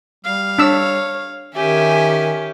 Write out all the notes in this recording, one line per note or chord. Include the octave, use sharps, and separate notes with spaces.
G3 F5
D4 C#5 E6
D#3 C#4 G4 E5 G#5